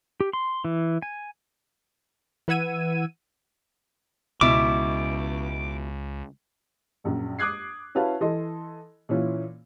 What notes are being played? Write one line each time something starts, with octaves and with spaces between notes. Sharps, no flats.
G4
C6
E3
G#5
E3 B4 F#5 E6 G#6 D#7
C#2 B2 E4 D6
A#1 F#2 A#2
D6 D#6 F#6 G#6 C7
C#4 E4 F#4 B4 F5 A5
E3 A4 D#5 C6
A#2 E3 C#4 E4 F4